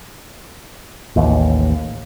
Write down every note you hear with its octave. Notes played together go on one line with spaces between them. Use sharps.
A1 D#2